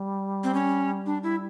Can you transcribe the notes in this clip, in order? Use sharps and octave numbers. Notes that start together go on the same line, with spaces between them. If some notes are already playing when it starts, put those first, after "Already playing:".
Already playing: G3
C4
C#4
D4
E4